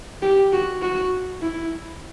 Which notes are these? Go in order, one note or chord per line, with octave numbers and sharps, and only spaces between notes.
G4
F#4
F#4
E4